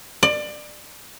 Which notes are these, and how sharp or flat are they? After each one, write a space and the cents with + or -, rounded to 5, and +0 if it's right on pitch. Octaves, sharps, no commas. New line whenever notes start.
D5 +25